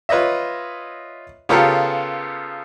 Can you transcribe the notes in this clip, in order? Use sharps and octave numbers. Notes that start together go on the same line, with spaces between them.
F4 B4 C#5 D#5 E5
C#3 B3 F4 G4 A4 A#4